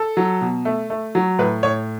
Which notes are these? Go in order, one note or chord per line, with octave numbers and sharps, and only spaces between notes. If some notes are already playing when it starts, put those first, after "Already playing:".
Already playing: A4
F#3
B2
A3
A3
F#3
A2 B4
A2 C#5